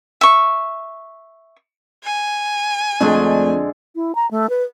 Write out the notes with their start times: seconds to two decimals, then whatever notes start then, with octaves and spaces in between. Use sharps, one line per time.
0.21 E5 C#6
2.04 G#5
3.00 F2 D3 G#3 A3 D4 D#5
3.95 E4
4.15 A#5
4.31 A3
4.50 B4